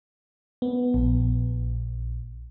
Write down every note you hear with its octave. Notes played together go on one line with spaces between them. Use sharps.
B3
A#1